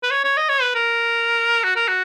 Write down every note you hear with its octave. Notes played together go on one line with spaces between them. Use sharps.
B4
C#5
C#5
D#5
C#5
B4
A#4
F#4
A#4
F#4